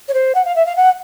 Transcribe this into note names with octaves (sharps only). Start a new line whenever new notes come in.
C#5
C5
F#5
F5
E5
F5
F#5